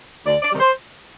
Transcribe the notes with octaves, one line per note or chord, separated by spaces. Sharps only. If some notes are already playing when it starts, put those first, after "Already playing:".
D2 D5
D5
C3 D#3 G3
C5